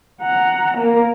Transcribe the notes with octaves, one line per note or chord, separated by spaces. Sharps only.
F#5 A#5
A#3 A#4